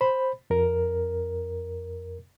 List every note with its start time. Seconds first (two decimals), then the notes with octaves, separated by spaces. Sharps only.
0.01 C5 B5
0.50 F2 A#4